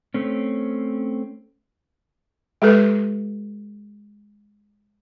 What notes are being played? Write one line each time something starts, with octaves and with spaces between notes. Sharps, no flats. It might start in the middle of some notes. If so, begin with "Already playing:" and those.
A3 C4 C#4
G#3 G4 A4 B4